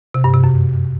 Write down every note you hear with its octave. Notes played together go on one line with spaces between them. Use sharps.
C3
G2
C3
F#2